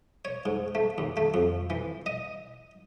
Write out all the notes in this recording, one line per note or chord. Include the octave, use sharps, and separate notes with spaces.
C#5
G#2
A3
D#2
A3
F2
E3
D#5